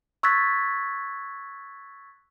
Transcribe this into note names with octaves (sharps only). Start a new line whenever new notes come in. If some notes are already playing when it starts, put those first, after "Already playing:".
C#6 E6 F#6 G#6 A6 B6